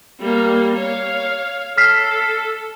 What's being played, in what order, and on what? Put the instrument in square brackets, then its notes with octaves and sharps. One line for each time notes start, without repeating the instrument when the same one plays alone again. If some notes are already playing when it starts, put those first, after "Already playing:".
[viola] G3 A#3
C#5 F5
[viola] A4 [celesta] F6 B6 C7